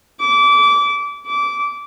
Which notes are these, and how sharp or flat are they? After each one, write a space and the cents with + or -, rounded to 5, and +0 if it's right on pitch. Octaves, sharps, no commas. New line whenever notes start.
D6 -25
D6 -20